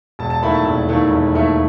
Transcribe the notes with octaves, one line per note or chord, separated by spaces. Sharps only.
E1 A5
A5
D#2 D#3 A3 E4 B5
A5
E1
D#2 D#3 A3 E4
E1
D#2 D#3 A3 E4